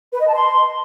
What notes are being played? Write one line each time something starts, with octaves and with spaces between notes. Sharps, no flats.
B4
D#5
A5
C6